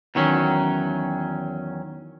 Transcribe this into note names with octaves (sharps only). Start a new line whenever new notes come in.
E2 D#3 F#3 C#4